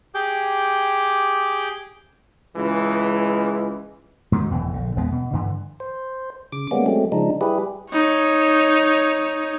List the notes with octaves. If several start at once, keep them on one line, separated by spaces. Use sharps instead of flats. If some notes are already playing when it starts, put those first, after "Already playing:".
G4 G#4 G5 D6 G6
C#2 E3 G#3
G#2 D#3 F3 F#3
F1 E2 B2 E3
A#1 D3
D#1 E2 G#3 B3
B2
G2 D3 E3
C5
C#3 D6
G3 G#3 A#3 B3 C#4
F#3 G#3 A3 C4
C#3 F3 G#3 D4 D#4
G3 E4 G4 G#4 B4
D#4 C#5